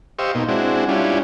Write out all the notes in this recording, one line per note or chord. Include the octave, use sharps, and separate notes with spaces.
G4 C5 D#5 F5 C#6 E6
B2 A#3 D#4
G#3 C4 D4 E4 F#4
G3 C#4 D4 E4 F4